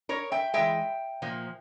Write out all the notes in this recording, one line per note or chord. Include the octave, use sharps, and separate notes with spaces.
A#4 C#5
E5 G5
E3 G#3 E5 G5
A#2 F3 A#3